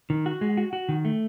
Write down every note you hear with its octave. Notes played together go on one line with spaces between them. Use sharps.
D#3
F#4
G#3
F#4
F#4
D#3
A3